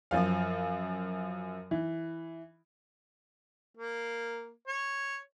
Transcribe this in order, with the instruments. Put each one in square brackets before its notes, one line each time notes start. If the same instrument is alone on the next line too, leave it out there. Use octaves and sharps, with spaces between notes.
[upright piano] F#2 F3 F5
E3
[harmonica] A#3
C#5